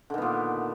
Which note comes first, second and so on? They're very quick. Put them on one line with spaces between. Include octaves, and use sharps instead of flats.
D3 D#3 B3 A#2